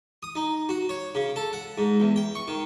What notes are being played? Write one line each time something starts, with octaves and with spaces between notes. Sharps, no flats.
D#6
D#4
F#4
C#5
C#3
A4
F#5
G#2
E2
G5
C#6
D#3